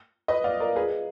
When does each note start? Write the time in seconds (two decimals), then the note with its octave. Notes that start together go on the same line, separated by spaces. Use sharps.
0.28 B4 D#5
0.44 D5 F5
0.60 A#4 D5
0.76 G#4 B4